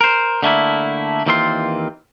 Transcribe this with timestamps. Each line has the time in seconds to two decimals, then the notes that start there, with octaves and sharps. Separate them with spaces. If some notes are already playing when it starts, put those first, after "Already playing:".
0.01 A#4 C5
0.43 D3 A3 A#3 E4
1.26 D#2 E3 A#3 C4 F4 C6